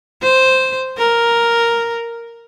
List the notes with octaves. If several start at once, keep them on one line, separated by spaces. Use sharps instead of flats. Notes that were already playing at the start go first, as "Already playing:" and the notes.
C5
A#4